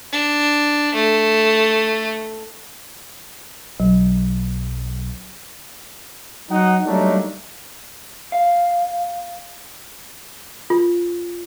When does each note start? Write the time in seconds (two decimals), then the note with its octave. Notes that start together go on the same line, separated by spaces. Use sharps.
0.12 D4
0.94 A3
3.80 B1 F#3
6.50 F#3 D#4 F#5
6.85 F#3 G3 A3 A#3 D4 D#4
8.32 F5
10.70 F4